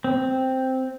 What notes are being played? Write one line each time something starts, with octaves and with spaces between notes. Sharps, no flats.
C4